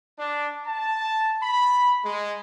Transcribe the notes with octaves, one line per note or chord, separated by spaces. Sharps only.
D4
A5
B5
G#3